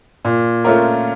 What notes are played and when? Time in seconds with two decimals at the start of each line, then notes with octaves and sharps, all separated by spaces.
0.25 A#2
0.64 A3 C#4 F4 A#4